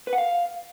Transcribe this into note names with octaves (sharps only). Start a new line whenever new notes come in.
B4
F#5
F5